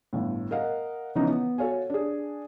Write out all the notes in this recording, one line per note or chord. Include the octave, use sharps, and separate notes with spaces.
G1 A2
A#4 D#5 F5 F#5
C#3 E3 F3 B3 C#4 D#4
B3
F#4 A4 C#5 F5 G#5
D4 G#4